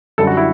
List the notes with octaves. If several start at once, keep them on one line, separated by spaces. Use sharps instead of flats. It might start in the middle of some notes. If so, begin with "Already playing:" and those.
F#2 D3 G3 A4
F#4
E4